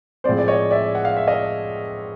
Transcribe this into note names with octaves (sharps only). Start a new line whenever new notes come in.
A2 F3 G#3 C4 C5 D5
D5
C#5 D#5
D5 E5
F#5
F5
E5
D#5 F5